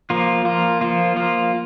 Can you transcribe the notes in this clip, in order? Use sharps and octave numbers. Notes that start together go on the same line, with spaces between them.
F3 A#3 F4
F3 A#3 F4
F3 A#3 F4
F3 A#3 F4